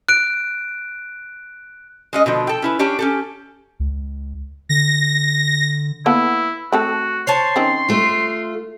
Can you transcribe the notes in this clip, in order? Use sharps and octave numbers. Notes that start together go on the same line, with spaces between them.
F#6 D7
G#3 C#4 D#5
B2 D3 F3
A4 G5
C#4 E4 B4
C#4 D4 G4 C#5
C#4 G4 A4
C#2
D3 A#6
A#3 B3 E4 A4
A3 C4 F#4 A4
C5 C#5 A5 C6
D#3 C4 C#4
A3 F4